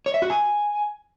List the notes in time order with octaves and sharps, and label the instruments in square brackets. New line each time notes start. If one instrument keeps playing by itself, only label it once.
[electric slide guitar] C#5
E5
F#4
G#5